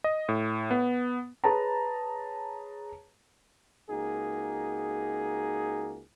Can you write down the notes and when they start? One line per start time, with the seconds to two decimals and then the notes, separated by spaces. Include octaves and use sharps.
0.04 D#5
0.29 A2
0.71 B3
1.44 G#4 B4 C#5 A5 A#5
3.90 C#2 A#3 D#4 F#4 G#4